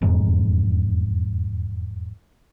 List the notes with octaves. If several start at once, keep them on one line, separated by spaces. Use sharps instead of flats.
E1 F2 G#2